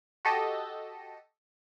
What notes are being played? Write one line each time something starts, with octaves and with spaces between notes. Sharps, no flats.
F#4 G4 A4 D#5